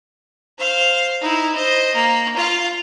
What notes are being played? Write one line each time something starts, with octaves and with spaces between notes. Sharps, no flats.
C5 F5
D#4 E4
C5 D#5
A#3
F4 F5